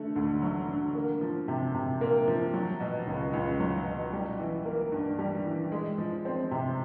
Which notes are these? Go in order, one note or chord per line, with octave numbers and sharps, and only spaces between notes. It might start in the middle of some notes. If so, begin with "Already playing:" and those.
Already playing: D3 A3
D2
F#3
D3
A#3
F3
C3
C3
A#3
F3
F#3
B2
C#2
C#2
F#3
B2
G3
E3
A#3
G2
G3
E3
G#3
F3
C4
C3